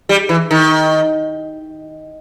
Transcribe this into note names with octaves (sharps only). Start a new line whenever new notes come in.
G3
E3
D#3